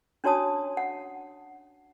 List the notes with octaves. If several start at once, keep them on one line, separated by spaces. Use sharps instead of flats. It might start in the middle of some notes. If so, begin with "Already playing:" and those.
C#4 D4 F#4 C#5 A5 D#6
F#5